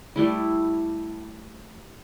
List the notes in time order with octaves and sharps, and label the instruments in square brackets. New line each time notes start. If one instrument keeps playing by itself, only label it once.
[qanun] G3 A3 E4